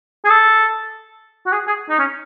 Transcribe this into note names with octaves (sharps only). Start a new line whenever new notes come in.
G#4
A4
F#4
G#4
G#4
D#4
C#4